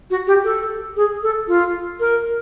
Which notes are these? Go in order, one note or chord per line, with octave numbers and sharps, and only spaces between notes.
F#4
G4
A4
G#4
A4
F4
A#4